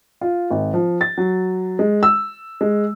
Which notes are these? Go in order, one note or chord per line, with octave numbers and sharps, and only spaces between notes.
F4
G#1
F3
A6
F#3
G#3
E6
G#3